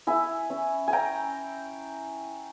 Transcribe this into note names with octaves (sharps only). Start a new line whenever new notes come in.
E4 E5 G#5
C#4
G#5
C#4 G5 A#5